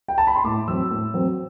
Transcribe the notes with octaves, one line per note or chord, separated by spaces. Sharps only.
G5
A5
B5
C6
A2 D6
F#3 C4 E6
A2
F#3 C4